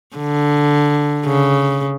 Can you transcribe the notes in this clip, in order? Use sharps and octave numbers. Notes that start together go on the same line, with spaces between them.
D3
C#3